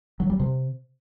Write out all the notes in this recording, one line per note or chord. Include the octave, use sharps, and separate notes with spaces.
F#3
G3
C3